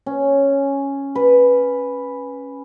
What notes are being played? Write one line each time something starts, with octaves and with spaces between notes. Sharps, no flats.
C#4
B4